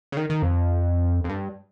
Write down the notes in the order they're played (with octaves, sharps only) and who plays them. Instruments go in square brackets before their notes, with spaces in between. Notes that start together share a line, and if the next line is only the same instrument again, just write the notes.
[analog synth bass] C#3
D#3
D#3
F2
F2
G2